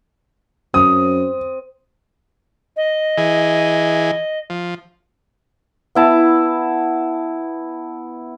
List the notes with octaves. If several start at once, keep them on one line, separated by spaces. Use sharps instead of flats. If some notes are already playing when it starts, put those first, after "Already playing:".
F#2 C4 D#6
D#5
E3 G#4
F3
B3 E4 A5